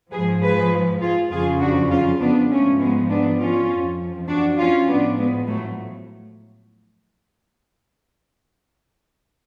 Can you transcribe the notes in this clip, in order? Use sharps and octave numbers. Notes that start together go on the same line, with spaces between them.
G#2 F3 G#4 B4
G#4 B4
F4 G#4
F2 C#3 F3 F4 G#4
D4 F#4
C#4 F4
B3 D4
G#2 F3 A3 C#4
G#3 B3
B3 D4
C#4 F4
F2 F3
D4 F#4
C#4 F4
A2 F3 B3 D4
G#3 B3
F#3 A3